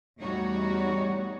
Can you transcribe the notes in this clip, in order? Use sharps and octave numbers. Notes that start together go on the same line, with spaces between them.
E2 G3 A3 D#4 F#4 C#5